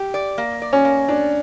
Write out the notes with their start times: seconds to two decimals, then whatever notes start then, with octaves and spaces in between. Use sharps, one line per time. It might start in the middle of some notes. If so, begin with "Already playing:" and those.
Already playing: G4
0.14 D5
0.38 A#3
0.62 D5
0.73 C#4
0.85 A#3
1.08 D4 D5